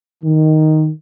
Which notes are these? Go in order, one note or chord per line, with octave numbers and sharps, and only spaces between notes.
D#3